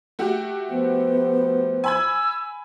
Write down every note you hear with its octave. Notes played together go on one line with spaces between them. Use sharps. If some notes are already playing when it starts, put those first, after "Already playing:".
A3 F#4 G4
F3 B3
G#5 B5 E6 G#6